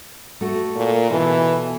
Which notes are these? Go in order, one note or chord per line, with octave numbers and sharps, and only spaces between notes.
A3 F#4
A#2
B2 E3 A4